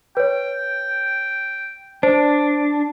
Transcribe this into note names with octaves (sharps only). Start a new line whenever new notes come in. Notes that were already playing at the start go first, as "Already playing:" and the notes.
B4 C#5 G5
D4 C5